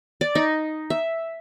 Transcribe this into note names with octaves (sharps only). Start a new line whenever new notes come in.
D5
D#4
E5